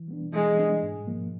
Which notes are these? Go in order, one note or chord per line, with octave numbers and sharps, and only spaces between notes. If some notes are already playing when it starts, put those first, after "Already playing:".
Already playing: E3
G3 B3 D4
E3 G#3
G3 B3 D4
G#2
F3 A#3